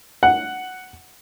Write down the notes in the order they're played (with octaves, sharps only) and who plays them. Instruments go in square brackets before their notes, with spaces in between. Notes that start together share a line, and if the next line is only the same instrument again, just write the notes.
[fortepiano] F#5